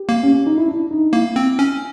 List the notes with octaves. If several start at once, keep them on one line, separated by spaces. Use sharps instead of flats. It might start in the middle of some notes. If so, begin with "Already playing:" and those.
Already playing: G4
A#3
C#4
C#4
D#4
E4
D4
D#4
A#3 E4
C4
C#4